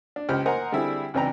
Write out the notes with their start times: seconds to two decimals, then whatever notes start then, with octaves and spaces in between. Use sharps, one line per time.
0.16 D4
0.29 C#2 G4 C5 F6
0.46 A#4 C5 D#5 F#5 G#5 A#5
0.72 D3 G3 C4 E4 G#4
1.14 C#2 C3 E3 D4 G5 A#5